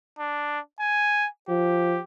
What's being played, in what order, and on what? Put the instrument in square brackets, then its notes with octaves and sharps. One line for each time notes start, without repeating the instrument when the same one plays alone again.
[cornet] D4
G#5
[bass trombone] F3 [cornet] G4